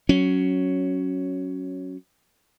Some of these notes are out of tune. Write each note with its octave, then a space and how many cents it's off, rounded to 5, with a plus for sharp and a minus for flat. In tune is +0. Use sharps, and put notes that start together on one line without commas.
F#3 +0 C#4 +0